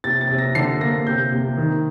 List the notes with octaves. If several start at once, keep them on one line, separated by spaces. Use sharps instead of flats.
C3 A6
A6
C3
A#6
D3 C7
A#3 A#6
C3 G6
C3
D#3